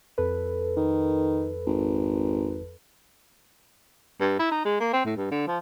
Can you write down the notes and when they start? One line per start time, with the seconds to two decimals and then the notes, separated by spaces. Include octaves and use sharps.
0.18 F2 A4 B4
0.77 D#3
1.67 G#1
4.21 G2
4.39 E4
4.51 D#4
4.65 G#3
4.80 A#3
4.93 C4
5.05 A2
5.16 G2
5.31 D3
5.47 F3